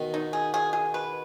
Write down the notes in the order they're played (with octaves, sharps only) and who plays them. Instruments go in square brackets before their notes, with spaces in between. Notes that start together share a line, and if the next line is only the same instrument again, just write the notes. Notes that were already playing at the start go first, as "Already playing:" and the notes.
Already playing: [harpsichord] B2 D#3
[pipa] D#4
G#4
G#4
G#4
B4